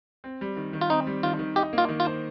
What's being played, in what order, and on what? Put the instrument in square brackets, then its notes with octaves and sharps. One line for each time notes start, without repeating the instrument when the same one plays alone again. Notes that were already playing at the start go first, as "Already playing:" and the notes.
[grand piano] C4
G3
D#3
D#3
[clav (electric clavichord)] F4
[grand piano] C4 [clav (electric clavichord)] D#4
[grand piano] G3
[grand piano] D#3 [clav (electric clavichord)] F4
[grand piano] D#3
[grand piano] D#4 [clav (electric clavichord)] G4
[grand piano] A#3
[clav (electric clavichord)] F4
[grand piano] D#3
[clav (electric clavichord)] F4
[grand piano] C5